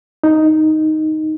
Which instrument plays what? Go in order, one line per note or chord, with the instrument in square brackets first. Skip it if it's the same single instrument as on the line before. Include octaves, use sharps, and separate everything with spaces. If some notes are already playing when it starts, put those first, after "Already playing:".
[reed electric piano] D#4